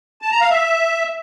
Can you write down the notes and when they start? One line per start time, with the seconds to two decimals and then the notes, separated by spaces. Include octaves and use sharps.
0.22 A5
0.31 A#5
0.41 F5
0.50 E5